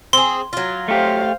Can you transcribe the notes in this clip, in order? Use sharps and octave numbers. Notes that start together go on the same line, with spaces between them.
C4 G#4 C6
F#3 F4
A3 G4 C5 F5